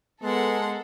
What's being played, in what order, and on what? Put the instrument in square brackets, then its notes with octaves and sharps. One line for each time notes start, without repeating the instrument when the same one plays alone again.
[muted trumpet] G#3 [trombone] B3 [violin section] A4 [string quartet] A#4 F#5 C6